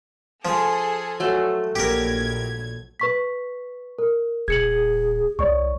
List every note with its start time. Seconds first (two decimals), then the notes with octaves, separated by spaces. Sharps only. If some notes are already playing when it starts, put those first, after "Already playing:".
0.45 F3 G#4 A4
1.20 F#3 A3
1.76 A#1 G4 A#4 G#6
3.00 B4 C#6 B6
3.98 A#4
4.48 D#1 G#4 G#6 C#7 F#7
5.39 C2 C#5 D5 C#6